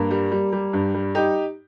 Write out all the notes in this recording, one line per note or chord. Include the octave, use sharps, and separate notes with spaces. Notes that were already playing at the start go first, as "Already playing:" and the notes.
Already playing: G2 A#3
G3
G3
G3
G2
G3
D#4 G4